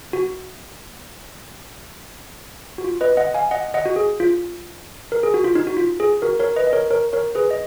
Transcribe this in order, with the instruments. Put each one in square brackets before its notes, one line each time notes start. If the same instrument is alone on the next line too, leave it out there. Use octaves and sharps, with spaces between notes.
[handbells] F#4
F#4
F4
B4 D#5
D#5 F#5
F5 G#5
D#5 F#5
D#5 F#5
F#4
G#4
F4
A#4
G#4
F#4
F4
D#4
F#4
F4
G#4
F#4 A#4
A#4 C#5
B4 D#5
D#5
A#4 C#5
A#4 C#5
A#4 C#5
G#4 B4
D#5